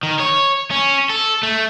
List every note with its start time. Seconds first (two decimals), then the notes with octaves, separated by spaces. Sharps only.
0.03 D#3
0.20 C#5
0.71 C#4
1.10 A4
1.43 A3